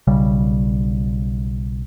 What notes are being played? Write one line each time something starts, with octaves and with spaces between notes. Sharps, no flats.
B1 C#3 G3